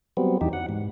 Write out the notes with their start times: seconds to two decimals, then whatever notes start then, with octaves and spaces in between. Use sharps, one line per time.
0.17 F#3 G3 B3 C4
0.41 E2 E3 D#4 G4
0.53 F#5
0.69 G#2